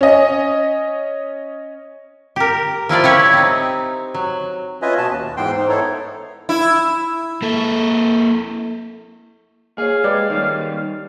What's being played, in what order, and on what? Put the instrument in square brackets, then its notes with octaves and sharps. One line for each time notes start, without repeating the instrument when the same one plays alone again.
[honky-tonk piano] C#4 D#5
[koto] G4 A#4
F3 E4 F4 D5
E4 G4 C#5
C4 D#4
F#3
[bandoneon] C#4 F4 B4 D#5 E5 G#5
B2 F#4 A5
D#2
G#2 E3 B3 G5 C6
G#2 D#4 C5
B3 D#4 E4 A4 C#5
[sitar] E4
[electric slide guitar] A#3 A4
[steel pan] A#3 C#5 [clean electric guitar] G#4 [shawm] F5
[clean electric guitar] G#3 [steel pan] G4 B4 D5
[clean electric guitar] D#3 G3 [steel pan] C#5